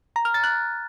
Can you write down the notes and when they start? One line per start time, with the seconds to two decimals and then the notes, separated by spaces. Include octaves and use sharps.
0.16 A#5
0.25 F6
0.34 A6
0.44 F#6